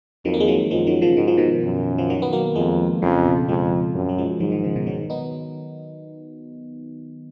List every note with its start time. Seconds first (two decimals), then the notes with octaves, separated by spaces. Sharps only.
0.25 F2 D#3 F#3
0.34 A#3
0.40 G#3
0.48 D#3 F#3
0.71 F#2 F3 G#3
0.87 D#3 F#3
1.01 C#3 F3
1.17 G#2 D#3
1.28 F3
1.38 B2 D#3
1.64 F#2
1.98 F3
2.10 D#3 F#3
2.22 B3
2.33 F#3 A#3
2.55 F2 F3 G#3
3.02 F2 C#3
3.26 B2
3.48 F2 F3 G#3
3.95 F#2
4.09 F#3
4.18 F3 G#3
4.40 G#2 D#3 F#3
4.52 D#3 F#3
4.64 C#3 F3
4.75 B2 D#3
4.86 D#3 F#3
5.10 B3 D#4